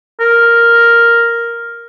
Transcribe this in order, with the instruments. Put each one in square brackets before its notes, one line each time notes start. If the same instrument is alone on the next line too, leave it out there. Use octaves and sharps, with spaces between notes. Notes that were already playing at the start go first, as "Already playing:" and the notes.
[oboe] A#4